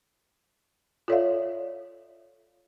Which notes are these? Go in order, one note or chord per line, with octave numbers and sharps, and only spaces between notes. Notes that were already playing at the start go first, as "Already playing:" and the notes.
F4 A4 C#5 D5 E5 F5